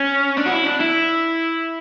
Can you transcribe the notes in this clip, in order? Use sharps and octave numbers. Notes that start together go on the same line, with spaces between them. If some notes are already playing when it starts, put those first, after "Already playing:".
Already playing: C#4
D4
F#4
E4
D4
E4